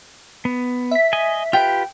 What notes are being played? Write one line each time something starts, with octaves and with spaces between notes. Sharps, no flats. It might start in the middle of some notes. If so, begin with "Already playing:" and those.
B3
E5 B6
D#5 G#5
F4 G4 B4 G5